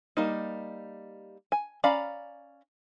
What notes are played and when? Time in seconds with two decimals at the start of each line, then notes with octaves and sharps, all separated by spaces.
0.17 G3 A#3 D#4
1.52 G#5
1.84 C#4 D5 F5 A#5 B5